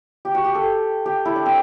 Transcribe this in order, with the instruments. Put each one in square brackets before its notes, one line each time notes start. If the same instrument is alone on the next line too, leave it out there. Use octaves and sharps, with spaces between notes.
[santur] G4
F#4
G4
A4
G4
E4
D4
C4